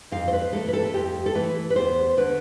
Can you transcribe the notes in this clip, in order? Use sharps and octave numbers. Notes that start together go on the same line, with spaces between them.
F2 F5
C5
B4
E3 A3 E4 A4
B4
A4
A4
F2 G4
A4
E3 A3 E4 B4
B4
E2 C5
D3 A3 B4